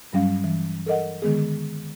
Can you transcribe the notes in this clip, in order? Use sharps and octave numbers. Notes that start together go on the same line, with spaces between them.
G2 F#3 G3 C#4 F5
E3
A4 A#4 D#5 F#5
D3 D#3 G#3 B3 G#4